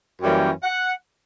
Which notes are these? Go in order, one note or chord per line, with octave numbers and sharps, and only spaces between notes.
F#2 E3 G3 A#3 C#4 G5
F#5